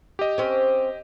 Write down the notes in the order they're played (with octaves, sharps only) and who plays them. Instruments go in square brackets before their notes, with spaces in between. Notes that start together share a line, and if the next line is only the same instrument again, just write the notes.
[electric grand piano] G4 D#5
[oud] C4 C#4